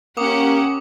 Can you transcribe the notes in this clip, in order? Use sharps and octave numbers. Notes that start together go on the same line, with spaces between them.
A#3 C#4 G4 F#5 D6 D#6